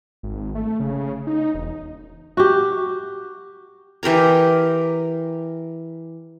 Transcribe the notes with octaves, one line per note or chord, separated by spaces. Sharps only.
G#1
A3
C#3
D#4
E1
F#4 G4
E3 G4 A#4 A#5